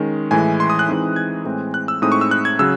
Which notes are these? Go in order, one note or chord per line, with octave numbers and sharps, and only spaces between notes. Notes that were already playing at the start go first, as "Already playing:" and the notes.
Already playing: D#3 G#3 C#4
A2 E3 G#3 G#5
C6
D#6
F#6
E3 G#3 C4 D#4
G#6
A2 E3 G#3 C4
F#6
E6
A2 G#3 C4 D#4 D#6
C#6
E6
F#6
G#6
C#3 F#3 E6